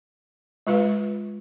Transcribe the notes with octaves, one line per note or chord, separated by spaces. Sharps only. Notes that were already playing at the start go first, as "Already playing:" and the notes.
G#3 F4 B4 F5